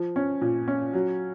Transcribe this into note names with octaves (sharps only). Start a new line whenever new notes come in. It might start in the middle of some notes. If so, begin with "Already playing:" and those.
Already playing: F3
C#4
A#2
C#4
F#3